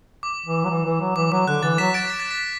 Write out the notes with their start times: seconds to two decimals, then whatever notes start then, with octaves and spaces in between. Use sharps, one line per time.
0.23 D6
0.46 E3
0.64 F#3
0.70 E3
0.85 E3
1.01 F#3
1.16 E3 D6
1.32 F#3 D6
1.48 D3 F#6
1.63 E3 A6
1.78 F#3 B6 E7
1.94 A6 D7
2.10 B6
2.20 A6
2.31 B6